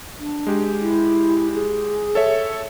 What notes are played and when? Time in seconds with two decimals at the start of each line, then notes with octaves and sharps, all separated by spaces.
0.20 D4
0.47 G#3 G4
0.82 E4
1.55 G#4
2.15 A4 C#5 E5